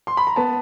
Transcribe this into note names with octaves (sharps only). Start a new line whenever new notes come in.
C6
B5
A#5
B3 A5